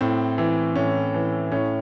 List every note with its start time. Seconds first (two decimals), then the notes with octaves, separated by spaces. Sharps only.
0.01 A2 C4
0.38 E3
0.75 A2 C#4
1.14 E3
1.52 A2 C#4